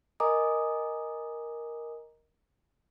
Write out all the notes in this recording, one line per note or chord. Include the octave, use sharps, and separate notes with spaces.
A#4 D#5 G#5 A#5 D6 D#6